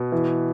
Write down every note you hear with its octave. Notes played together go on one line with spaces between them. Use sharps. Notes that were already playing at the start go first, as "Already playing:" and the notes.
Already playing: B2 B4
E3